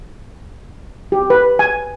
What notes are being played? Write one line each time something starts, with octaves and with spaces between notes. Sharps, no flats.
G4
B4
G#5